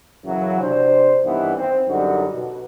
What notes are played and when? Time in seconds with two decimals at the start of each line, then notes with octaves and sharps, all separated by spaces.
0.25 F#2 C#3 E3 F#3
0.61 C3 D4 C5
1.25 G2 D#3 E3 B3
1.56 C4
1.88 F#2 D3 G3 D#4 F#4
2.34 B2